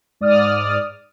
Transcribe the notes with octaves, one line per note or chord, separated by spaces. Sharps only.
G#2 D5 D#6 F6